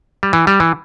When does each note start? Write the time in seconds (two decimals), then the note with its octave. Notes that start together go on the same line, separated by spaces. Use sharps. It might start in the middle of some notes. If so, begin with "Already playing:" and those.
0.23 G3
0.33 E3
0.47 G3
0.60 E3